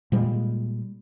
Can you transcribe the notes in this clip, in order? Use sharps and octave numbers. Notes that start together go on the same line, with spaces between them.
A#2 G3 G#3